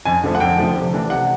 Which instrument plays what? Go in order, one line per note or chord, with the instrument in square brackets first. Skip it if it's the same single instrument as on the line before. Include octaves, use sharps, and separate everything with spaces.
[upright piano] F2 G#5
D3 F3 A3
F#5
F2 G5
D3 F3 A3
C3
E3 A3 D4
C3 F#5